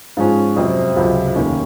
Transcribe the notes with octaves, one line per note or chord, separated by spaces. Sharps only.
G#2 F3 G#3 C#4 F4
F2 C3 F#3 C4
C#2 C3 F#3 C4 F4
F1 D#2 D#3 A#3 C#4